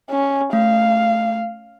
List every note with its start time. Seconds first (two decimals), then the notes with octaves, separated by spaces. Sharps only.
0.10 C#4
0.53 A3 F5